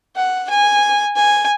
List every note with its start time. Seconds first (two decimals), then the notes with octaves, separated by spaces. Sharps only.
0.16 F#5
0.50 G#5
1.16 G#5